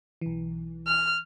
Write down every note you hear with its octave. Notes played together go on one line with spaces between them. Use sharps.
B1 E3
F6